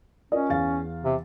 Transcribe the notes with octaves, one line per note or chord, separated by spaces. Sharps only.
C#4 F4 A#4 D#5
E2 F5 A6
C3